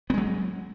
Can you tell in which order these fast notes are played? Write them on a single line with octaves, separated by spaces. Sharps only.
B3 G#3 F#3